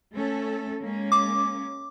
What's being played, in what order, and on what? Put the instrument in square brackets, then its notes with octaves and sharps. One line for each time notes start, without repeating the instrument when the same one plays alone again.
[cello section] A3 C#4 A4
G#3 A#3 C#4
[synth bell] D6